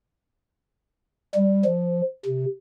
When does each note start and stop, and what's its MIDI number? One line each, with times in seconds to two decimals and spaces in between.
1.35 1.64 55
1.65 2.02 53
2.26 2.46 48